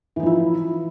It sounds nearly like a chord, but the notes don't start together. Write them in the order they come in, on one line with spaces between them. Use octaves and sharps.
E3 D#4 F3 E4